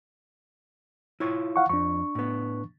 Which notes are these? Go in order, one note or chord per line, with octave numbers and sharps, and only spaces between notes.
E4 F4 C#5
F5 F#5 C#6
F2 D4 C#6
A2 B3